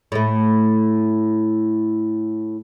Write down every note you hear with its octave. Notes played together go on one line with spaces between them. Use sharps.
A2 A3